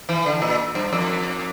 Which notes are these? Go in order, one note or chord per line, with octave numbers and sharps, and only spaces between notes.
E3
D3
A#2
G2
F2